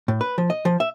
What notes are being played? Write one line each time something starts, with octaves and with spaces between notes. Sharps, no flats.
A2
B4
F3
D#5
F3
E5